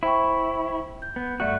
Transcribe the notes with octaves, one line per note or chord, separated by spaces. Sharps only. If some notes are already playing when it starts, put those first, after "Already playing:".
E4 C5 G5 C#6
G6
B3
G2 A3 F#4 D5 E5 F#6